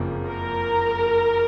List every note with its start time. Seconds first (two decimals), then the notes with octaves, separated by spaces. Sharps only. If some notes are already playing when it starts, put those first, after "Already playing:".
Already playing: F#1 F2 C#3 F3 A#3
0.27 A#4